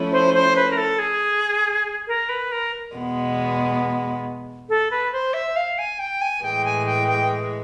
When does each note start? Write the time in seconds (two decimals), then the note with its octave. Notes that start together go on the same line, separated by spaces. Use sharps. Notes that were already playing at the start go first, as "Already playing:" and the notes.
Already playing: F3 A3 C#4 E4
0.12 C5
0.34 C5
0.56 B4
0.71 A#4
0.77 A4
0.99 G#4
2.08 A#4
2.29 B4
2.52 A#4
2.95 E2 B2 G#3 B3
4.69 A4
4.91 B4
5.12 C5
5.34 E5
5.56 F5
5.78 G#5
5.99 G5
6.21 G#5
6.43 A2 E3 G#3 G5
6.65 G#5
6.86 G5
7.08 G5